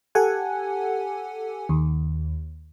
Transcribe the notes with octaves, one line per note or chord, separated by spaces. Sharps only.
G4 A4 F#5 G#5
D#2